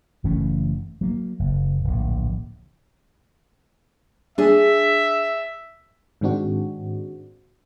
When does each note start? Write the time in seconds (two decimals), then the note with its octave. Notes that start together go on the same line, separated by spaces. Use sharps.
0.24 F#1 E3 A3 C#4
1.01 F#3 A#3
1.39 F#1
1.84 D1 A#1
4.38 D4 G#4 E5
6.21 G#2 D#3 G#3 C4 D4 F#4